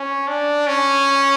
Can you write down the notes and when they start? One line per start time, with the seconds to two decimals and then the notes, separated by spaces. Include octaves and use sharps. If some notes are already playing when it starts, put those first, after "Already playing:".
Already playing: C#4
0.28 D4
0.67 C#4